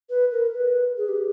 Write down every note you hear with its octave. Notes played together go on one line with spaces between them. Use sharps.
B4
A#4
B4
G#4
G4